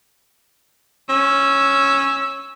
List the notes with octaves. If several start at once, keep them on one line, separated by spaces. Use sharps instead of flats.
C#4 E6